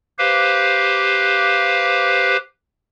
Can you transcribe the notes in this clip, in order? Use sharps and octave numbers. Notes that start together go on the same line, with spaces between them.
G4 B4 C5 F5